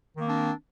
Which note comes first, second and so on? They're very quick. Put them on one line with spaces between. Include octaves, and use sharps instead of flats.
D#3 A#3 C4 D4